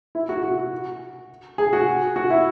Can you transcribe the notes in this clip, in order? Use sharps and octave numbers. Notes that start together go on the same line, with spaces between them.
E4
F#4
F#4
G#4
F#4
F#4
E4